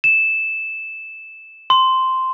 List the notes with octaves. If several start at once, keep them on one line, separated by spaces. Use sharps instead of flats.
E7
C6